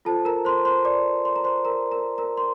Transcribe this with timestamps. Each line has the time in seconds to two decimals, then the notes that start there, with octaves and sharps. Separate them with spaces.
0.05 F4 A4 C5 A5
0.25 A#4 A#5
0.45 C5 C6
0.65 C5 C6
0.85 D5 D6
1.25 C6
1.36 A#5
1.44 C5 C6
1.65 A#4 A#5
1.92 A#4 A#5
2.18 A#4 A#5
2.37 C6